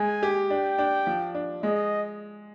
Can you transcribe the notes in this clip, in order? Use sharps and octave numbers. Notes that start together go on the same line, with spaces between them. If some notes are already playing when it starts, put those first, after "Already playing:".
Already playing: G#3 G#5
G4
D4 G5
D4
F3
D4
G#3 D#5